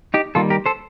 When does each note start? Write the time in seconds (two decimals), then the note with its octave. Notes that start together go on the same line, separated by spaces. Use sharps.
0.14 D#4 G4
0.35 D#3 G3 A#3 F4 A4
0.50 G4 A#4
0.66 A4 C5